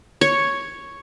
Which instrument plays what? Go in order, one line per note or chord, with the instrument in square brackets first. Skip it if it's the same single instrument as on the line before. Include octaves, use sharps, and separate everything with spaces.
[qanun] C#5